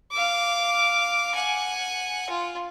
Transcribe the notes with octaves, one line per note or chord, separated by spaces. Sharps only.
F5 D6
F#5 G#5
F4